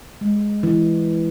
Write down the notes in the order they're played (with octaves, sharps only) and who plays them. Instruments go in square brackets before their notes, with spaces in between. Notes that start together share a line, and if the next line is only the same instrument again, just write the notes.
[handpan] G#3
E3